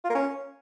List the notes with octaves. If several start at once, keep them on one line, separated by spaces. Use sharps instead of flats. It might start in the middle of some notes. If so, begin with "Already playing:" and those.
F4
A#3
C#4